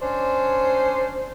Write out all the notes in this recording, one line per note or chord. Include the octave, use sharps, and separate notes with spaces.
C#4 D4 C5